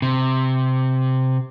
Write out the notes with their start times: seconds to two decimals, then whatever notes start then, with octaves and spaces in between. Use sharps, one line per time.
0.02 C3